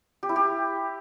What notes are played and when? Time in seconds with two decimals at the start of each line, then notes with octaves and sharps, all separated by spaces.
0.23 G4
0.29 E4
0.36 G4